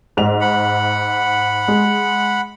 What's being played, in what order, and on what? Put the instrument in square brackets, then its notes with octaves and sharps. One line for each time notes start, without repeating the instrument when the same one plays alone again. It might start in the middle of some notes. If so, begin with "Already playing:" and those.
[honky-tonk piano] G#2 F7
[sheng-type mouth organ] F#5 B5
[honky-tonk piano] G#3